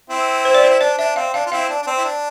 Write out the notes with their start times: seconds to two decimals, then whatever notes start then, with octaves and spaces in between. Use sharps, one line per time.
0.10 C4 E4
0.45 C5
0.55 D5
0.64 C5
0.70 E4
0.80 D4 D5
0.98 D4 E5
1.16 C4 F5
1.34 D4 F5
1.46 F4
1.52 C4 E4 F5
1.70 D4
1.82 D4
1.87 C4
1.98 E4
2.05 D4